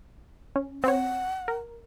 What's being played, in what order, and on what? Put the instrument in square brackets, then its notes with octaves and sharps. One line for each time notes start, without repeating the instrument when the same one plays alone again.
[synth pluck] C#4
[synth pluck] C4 C#5 [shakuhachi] F#5
[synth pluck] A#4